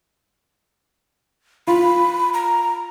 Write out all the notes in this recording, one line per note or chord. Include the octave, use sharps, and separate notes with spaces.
F4 B5
A#5